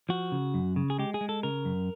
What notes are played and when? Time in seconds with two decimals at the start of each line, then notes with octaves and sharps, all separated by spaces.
0.09 F3 F#4
0.32 C#3
0.54 F#2
0.76 C#3
0.90 G#4
0.99 G#3 G4
1.14 G#4
1.21 G#3
1.29 A4
1.43 C#3 A#4
1.65 F#2